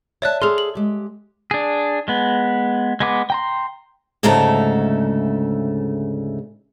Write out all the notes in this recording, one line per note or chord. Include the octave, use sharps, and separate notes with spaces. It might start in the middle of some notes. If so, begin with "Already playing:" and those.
C#5 D5 E5 A5 F#6
G#4 A4 C6 F6 F7
F#7
G#3 G4
D4 G#4
G#3 B3
G#3 B3 D6
G5 A#5 C6
D2 G#2 C#3 A3 A4 A#5